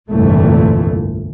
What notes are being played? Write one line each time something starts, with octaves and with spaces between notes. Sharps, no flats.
G1 C2 F2 A#2 E3 A3